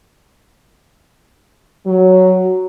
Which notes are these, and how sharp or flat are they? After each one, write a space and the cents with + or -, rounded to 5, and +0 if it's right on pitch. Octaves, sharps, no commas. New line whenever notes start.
F#3 +5